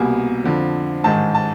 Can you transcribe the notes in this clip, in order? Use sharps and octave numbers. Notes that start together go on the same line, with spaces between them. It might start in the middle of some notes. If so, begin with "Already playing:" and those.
Already playing: C2 B2 G3 A#3 G#5
F2 D3 F3
A1 G#2 D#3 G#3 A5
A5